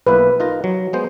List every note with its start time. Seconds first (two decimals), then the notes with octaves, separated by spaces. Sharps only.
0.07 B1 A#3 E4 B4
0.40 D#4 F4 A#4
0.64 F#3
0.93 G#3 B3 C5